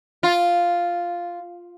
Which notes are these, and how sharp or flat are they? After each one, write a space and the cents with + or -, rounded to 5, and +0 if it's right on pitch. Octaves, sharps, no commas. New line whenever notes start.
F4 +0